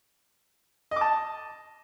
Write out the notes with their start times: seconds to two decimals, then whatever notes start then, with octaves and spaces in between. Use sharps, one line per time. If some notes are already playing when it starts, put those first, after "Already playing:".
0.91 D#5
0.96 D6
1.01 A5